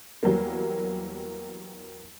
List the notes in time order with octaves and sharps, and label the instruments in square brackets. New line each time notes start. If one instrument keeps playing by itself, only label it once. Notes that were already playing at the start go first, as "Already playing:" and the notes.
[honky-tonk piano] E2 F#3 G3 A#3